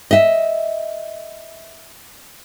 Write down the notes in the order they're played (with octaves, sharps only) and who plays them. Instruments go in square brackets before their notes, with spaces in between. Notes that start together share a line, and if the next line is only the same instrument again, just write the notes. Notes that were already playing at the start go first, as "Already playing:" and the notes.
[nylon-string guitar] D#5 E5